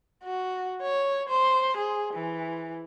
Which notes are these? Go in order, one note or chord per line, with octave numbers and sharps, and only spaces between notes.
F#4
C#5
C5
G#4
E3